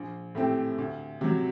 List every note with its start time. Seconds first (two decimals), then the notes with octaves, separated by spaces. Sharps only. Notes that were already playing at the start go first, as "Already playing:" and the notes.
Already playing: A#1
0.35 A2 A3 C4 G4
0.78 D2
1.21 C3 F#3